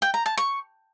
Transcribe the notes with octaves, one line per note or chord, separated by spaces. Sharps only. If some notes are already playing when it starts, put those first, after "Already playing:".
G5
A#5
A5
C#6